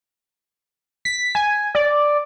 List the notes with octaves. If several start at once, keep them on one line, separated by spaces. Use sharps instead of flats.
B6
G#5
D5